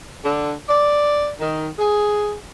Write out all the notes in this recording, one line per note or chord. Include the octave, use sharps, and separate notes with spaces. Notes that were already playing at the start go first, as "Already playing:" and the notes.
D3
D5
D#3
G#4